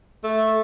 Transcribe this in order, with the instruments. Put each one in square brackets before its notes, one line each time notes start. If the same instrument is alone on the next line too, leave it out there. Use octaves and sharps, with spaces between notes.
[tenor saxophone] A3